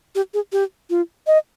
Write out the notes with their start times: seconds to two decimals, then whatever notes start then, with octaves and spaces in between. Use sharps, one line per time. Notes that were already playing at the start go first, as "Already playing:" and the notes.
0.15 G4
0.34 G#4
0.52 G4
0.90 F4
1.27 D#5